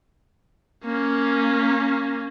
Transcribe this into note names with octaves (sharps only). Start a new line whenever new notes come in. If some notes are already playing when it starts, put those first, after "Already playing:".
A#3 C#4